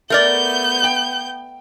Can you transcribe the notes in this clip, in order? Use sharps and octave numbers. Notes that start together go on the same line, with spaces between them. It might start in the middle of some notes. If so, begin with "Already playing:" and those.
A3 B3 A#4 D5 G6
G5